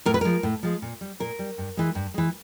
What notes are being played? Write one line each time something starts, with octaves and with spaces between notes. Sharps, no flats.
A2 A#4
B4
F3 G#3 A#4
A2
F3 G#3
A#2
G3
A#2 A#4
G3
G2
E3 G#3
G2
E3 G#3